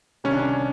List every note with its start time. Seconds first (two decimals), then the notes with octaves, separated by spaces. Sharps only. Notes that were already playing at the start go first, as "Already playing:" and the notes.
0.24 C2 C3 D#3 G3 C#4
0.32 D4
0.39 C#4